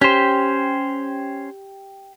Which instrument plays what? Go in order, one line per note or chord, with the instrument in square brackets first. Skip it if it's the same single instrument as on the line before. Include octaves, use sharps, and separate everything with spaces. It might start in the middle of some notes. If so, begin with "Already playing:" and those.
[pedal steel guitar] C#4 C5 [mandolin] G4